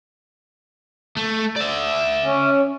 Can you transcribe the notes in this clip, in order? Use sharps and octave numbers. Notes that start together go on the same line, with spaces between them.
A3
D5 E5
C#4